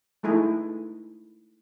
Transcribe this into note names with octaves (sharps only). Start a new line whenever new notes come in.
G#3 A3 D#4 E4 G#5